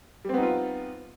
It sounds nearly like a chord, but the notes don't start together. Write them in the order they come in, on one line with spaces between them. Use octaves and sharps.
G3 C4 B3 D#4 F4